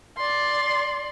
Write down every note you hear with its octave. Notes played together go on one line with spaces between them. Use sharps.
D5 C6